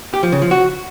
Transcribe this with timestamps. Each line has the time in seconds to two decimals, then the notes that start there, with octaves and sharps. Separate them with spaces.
0.14 G4
0.23 F3
0.32 C#3
0.42 F3
0.51 F#4